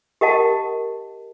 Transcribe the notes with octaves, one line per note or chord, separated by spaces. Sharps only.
G4 A#4 D#5 F#5 A5